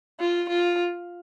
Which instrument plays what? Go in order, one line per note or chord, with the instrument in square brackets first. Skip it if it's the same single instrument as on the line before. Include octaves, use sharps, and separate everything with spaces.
[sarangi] F4
F4